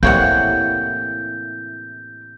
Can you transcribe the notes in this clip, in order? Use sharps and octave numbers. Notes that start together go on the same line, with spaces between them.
A2 C3 E3 A#3 E4 C#5 F#5 G6